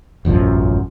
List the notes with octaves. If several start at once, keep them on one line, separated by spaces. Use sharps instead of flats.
E1 A1 F#2 F3